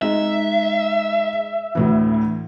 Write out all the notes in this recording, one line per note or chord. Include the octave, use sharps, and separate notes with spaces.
G#3 D#4 E5
D2 A2 E3